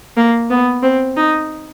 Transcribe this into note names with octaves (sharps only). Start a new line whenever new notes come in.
A#3
B3
C4
D#4